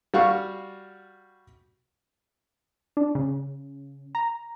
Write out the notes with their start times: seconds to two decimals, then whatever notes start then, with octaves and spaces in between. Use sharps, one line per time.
0.14 G3 F#4 F5 C#6
2.97 D4
3.15 C#3
4.15 A#5